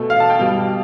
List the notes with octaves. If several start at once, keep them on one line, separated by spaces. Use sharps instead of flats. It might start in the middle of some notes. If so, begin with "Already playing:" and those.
Already playing: B2 A3
F5
A5
G5
B2 G3 F5